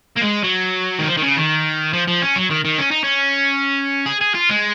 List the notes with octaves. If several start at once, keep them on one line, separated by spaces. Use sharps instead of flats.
A#3
G#3
F#3
D#3
F3
D#3
C#3
D#3
F3
F3
C#4
F#3
D#3
D#3
C#4
D#4
C#4
G#4
G#4
F4
G#3